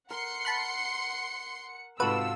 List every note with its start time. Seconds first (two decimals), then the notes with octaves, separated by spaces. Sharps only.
0.11 A#4 F#5 C6 C#7
0.45 A5 B5 F#6
2.00 G#2 C3 F4 F#4 A4 B4 E6